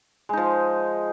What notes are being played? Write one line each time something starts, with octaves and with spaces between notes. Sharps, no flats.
F3 G#3 D#4